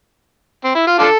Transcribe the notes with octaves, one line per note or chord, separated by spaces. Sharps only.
C4
E4
F4
D4 F4 A4